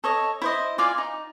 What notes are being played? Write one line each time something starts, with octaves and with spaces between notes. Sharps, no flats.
A4 C#5 D#5
E4 C5 D#5
F4 D5 F5 G#5
D#4